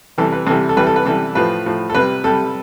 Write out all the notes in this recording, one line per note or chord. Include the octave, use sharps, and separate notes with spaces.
C3 E3 G3 A4
B4
C3 E3 G3 A4
A4
C3 E3 G3 B4
A4
B4
C3 E3 G3 A4
A2 F3 B4
A2 F3
A4
C3 G3 B4
C3 G3 A4